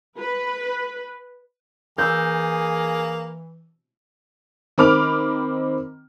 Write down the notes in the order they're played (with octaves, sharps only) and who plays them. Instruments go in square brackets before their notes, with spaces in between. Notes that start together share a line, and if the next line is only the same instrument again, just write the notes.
[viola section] B4
[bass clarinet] E3 [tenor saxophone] A#3 [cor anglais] G#4 [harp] E6 G6
[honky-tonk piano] D#3 C4 B5 D6 F6 F7